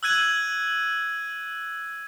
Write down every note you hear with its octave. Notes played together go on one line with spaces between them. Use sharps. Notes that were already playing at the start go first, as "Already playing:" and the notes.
E6 F#6 G#6 D#7 F#7